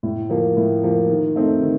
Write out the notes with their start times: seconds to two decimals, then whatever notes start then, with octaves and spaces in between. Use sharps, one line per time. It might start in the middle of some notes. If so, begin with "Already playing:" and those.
0.03 A2
0.30 F3 A#3
0.57 A2
0.83 F3 A#3
1.09 D#3
1.36 A3 C4 D#4
1.62 D#3